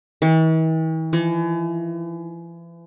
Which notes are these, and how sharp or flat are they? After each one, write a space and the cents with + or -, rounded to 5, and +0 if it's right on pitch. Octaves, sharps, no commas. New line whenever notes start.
E3 -45
E3 +40